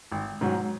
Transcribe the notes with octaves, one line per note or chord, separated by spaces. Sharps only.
G#1
G#2 F#3